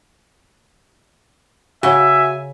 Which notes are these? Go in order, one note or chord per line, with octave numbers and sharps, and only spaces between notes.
C#3 F#4 E5 G#5